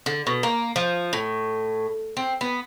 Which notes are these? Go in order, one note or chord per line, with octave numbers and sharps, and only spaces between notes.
D3
B2
A#3
F3
A2
C4
B3